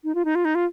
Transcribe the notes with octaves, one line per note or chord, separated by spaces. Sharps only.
D#4
F4
D#4
F4
D#4
F4